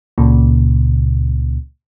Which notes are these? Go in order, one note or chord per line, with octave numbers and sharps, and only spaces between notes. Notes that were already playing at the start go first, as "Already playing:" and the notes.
C#2 A#2 C#3